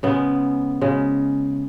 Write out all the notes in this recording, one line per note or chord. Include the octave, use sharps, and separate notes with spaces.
C#3 G#3 B3
C#3 G#3